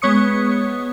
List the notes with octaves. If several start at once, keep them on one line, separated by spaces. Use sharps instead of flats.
G#3 B3 C#5 C#6 D#6 C#7